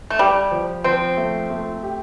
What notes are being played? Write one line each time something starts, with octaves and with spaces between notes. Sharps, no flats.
A3
G3 G4
F3
F3 C4
A3
A3
G4